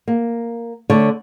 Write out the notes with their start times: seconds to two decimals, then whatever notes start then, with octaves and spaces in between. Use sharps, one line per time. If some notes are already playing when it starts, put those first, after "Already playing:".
0.08 A#3
0.90 D3 A3 C#5